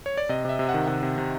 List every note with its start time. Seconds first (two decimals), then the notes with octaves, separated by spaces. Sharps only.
0.06 C#5
0.17 D5
0.29 C3 D#5
0.45 C3 E5
0.59 C3
0.69 F#5
0.74 D#3
0.88 C3 F#5
1.03 C3
1.18 C3